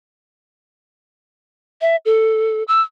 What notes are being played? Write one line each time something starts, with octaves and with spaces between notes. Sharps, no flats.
E5
A4
E6